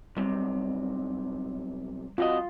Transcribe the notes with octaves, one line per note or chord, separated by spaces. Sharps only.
B1 C3 G3
C3 F4 F#4 D#5